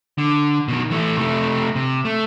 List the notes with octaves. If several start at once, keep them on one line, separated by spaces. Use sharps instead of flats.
D3
B2 D#3
E3 A3
C3 A3
C3
A3